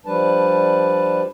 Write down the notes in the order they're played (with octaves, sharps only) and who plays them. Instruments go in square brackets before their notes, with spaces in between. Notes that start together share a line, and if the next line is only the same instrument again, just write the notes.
[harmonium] F3 G3 D4 B4 A5